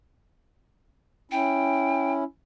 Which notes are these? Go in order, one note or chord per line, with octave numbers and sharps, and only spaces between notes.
C#4 E4 G5